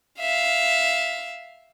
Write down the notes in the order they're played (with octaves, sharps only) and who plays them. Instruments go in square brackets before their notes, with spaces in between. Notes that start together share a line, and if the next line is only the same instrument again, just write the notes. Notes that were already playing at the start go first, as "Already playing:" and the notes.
[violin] E5 F5